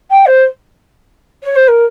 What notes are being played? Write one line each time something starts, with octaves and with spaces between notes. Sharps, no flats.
G5
C5
C#5
C5
A#4